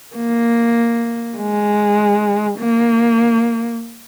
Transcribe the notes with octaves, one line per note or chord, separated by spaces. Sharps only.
A#3
G#3
A#3